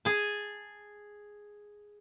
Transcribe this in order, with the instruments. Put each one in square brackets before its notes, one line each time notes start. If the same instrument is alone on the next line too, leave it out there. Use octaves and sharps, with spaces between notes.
[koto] G#4 A5